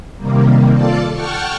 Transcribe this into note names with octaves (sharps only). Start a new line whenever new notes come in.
C3 D#3 G3 A#3
F4 A4 D5 A5
F#5 G5 A5 C#6 F6